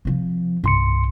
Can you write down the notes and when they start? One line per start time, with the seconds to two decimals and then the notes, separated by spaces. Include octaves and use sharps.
0.05 C3 F3
0.64 C2 G2 C6 C#7